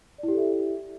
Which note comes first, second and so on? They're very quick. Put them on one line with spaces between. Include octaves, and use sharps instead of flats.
D5 E4 G4 A4 E5